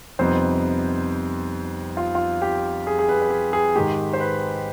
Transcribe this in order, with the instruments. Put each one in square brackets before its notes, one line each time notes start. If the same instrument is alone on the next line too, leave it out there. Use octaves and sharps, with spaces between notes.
[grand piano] F2 C3 G3 B3 D#4 C5
F4
F4
G4
G#4
G#4
B4
B4
G#4
G#4
G#2 D#3 G#3 G4
C5
B4